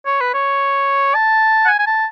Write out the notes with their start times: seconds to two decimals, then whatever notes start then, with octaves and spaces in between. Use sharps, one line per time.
0.06 C#5
0.21 B4
0.34 C#5
1.15 A5
1.65 F#5
1.68 G#5
1.79 G#5
1.87 A5